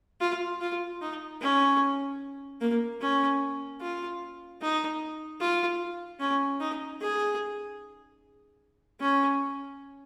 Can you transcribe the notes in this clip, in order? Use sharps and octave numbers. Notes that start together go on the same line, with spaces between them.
F4
F4
D#4
C#4
A#3
C#4
F4
D#4
F4
C#4
D#4
G#4
C#4